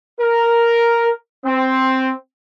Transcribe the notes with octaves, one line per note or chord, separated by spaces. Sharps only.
A#4
C4